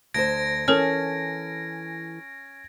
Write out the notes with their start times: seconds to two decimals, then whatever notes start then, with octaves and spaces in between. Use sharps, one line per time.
0.14 D2 C5 G#6 A#6 D7
0.68 E3 C#4 A4 A#4 C#5 F6